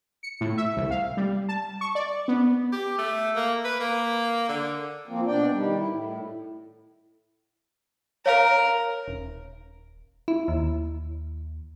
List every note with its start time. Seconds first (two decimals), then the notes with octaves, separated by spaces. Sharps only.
0.23 C#7
0.41 A2
0.57 E5
0.77 C2
0.91 F5
1.17 G3
1.49 A5
1.81 C#6
1.95 D5
2.28 B3
2.72 G4
2.98 A3
3.36 A#3
3.65 B4
3.80 A#3
4.49 D3
5.08 F3 A#3 C4
5.27 B2 D4 D5 G5
5.52 D#3 G3
5.76 E4
5.89 A2
8.26 A#4 C#5 F5
9.08 D#1
10.28 E4
10.48 D#2